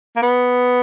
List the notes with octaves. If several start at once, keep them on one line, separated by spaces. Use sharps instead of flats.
A#3
B3